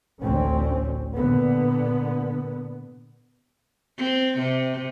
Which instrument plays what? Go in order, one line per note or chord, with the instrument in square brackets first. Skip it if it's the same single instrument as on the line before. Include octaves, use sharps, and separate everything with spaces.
[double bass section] A1 D2 C4 C#4
A#2 D3 B3
[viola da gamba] C4
C3